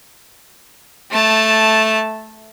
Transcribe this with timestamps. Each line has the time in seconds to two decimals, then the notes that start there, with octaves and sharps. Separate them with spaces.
1.11 A3 A5